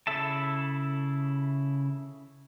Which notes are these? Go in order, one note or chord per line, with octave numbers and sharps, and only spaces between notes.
C#3 E4 A4 E5 A5